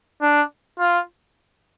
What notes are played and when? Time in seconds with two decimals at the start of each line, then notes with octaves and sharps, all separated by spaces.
0.22 D4
0.79 F4